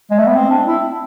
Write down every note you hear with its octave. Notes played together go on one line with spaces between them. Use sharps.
G#3
A3
B3
C4
D4
E4